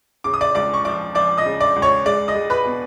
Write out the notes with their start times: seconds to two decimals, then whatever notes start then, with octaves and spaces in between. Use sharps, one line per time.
0.24 C#3 D6
0.34 D#6
0.41 D5 D6
0.55 C#2 D5 D6
0.74 C#6
0.85 F3 D5 D6
1.15 F3 D5 D6
1.38 D#5 D#6
1.46 C#3
1.60 D5 D6
1.76 C#2
1.82 C#5 C#6
2.06 G#3 D5 D6
2.28 D#5 D#6
2.35 G#3
2.50 B4 B5
2.65 B2